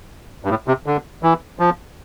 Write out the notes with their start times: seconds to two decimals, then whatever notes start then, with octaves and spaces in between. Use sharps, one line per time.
0.45 G2
0.50 A2
0.67 C3
0.86 D3
1.23 E3
1.59 F3